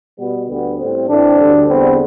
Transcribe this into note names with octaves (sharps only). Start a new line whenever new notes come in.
B2 G3 B3
D2 D3 G3 B3
A2 G3 C4
A2 E3 A3 C4 D4
D2 D3 G3
E2 D3 G3 B3 C4